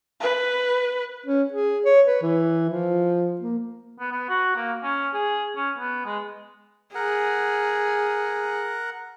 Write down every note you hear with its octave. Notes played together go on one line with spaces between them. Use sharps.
B4
C#4
G#4
C#5
B4
E3
F3
A#3
B3
B3
F#4
A#3
C#4
G#4
C#4
B3
G#3
G#4 A#4 F#5